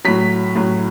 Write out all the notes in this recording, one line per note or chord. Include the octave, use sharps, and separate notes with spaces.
A2 F#3 B6
A2 F#3